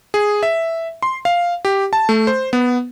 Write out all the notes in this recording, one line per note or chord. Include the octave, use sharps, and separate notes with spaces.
G#4
E5
C6
F5
G4
A5
A3
C5
B3